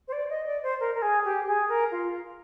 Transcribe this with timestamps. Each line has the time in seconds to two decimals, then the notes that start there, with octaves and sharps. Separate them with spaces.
0.07 C5
0.12 D5
0.29 D#5
0.46 D5
0.62 C5
0.79 A#4
0.94 A#4
1.01 G#4
1.24 G4
1.47 G#4
1.68 A#4
1.91 F4